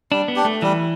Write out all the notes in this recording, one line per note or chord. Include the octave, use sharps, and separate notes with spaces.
G3 D4
B3
D4 G4
A3
E3 G3